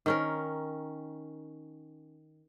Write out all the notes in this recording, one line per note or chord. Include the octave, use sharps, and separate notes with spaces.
D#3 C#4 A#4